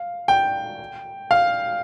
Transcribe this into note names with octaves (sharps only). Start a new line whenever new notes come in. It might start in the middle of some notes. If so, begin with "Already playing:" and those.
Already playing: F5
G5
F5